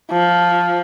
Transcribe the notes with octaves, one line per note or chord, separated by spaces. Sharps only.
F3